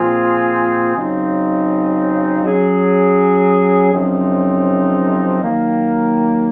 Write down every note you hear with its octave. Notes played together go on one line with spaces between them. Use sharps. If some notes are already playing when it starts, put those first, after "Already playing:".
Already playing: A#2 F3 C4 F4 G#4
C#3 F#3 C4 D#4
F#3 C#4 G#4
F#2 C#3 F3 C4 D#4
D#3 F#3 A#3